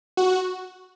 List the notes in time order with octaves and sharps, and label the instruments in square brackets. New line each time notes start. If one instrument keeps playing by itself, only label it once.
[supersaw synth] F#4